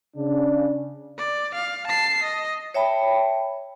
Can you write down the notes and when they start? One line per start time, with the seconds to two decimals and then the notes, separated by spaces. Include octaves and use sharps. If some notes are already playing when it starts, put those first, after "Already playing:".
0.16 C#3 D4
1.18 D5
1.55 F5
1.87 A5 C7
2.23 D#5
2.74 C#5 E5 G5 A5 B5